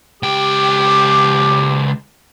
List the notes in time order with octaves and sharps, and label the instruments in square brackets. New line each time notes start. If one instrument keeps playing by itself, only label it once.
[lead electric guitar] C#2 G5 [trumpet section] G4 D6